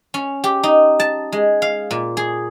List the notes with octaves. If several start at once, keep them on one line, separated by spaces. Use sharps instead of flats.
C#4
G4
D#4
A5
G#3
F5
A#2
G#4